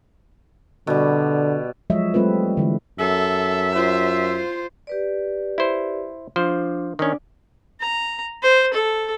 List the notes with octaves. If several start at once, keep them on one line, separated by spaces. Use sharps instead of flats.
B2 D3 G3
F3 F#3 G#3 C#5 D#5 E5
G3 A3 C4 F4 B4
D3 E3 G#3
F#2 A4 E5
F4 C5
G4 B4 D5
E4 C5
F3 D4 C5
D#3 C#4 D4 D5 G#5
A#5
C5
A4